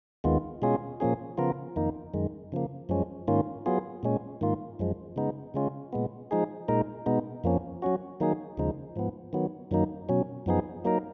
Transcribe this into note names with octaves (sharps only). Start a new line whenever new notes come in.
D#2 D#3 G#3 B3 F4
B2 G#3 C#4 F4 G#4
A#2 F3 A#3 C#4 G#4
C#3 F3 B3 F4 A#4
F2 D#3 A#3 D#4
F#2 D#3 G#3
C#3 F3 A#3
F#2 F3 G#3 C#4
G#2 D#3 A#3 C#4 F4
F#3 B3 F4 G#4
A#2 G#3 C#4
G#2 D#3 A#3 F4
F#2 F3 G#3
C#3 G#3 B3 D#4
C#3 G#3 C#4 F4
A#2 G#3 B3
F3 G#3 D#4 G#4
A#2 G#3 D#4 A#4
B2 G#3 B3 D#4
F2 F3 A#3 C#4
F#3 C#4 F#4
D#3 F#3 A#3 D#4 G#4
D#2 C#3 F3 G#3 D#4
G#2 F3 B3
D#3 F#3 B3
F#2 D#3 F#3 A#3 D#4
B2 F#3 C#4
F#2 F3 B3 D#4 G#4
F#3 A#3 D#4 A#4